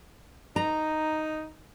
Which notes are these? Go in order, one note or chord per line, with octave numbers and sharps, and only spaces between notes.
D#4 A#5